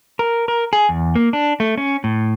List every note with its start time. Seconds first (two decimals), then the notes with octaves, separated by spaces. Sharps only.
0.19 A#4
0.48 A#4
0.73 G#4
0.89 E2
1.15 A#3
1.33 D4
1.60 A3
1.78 C#4
2.04 A2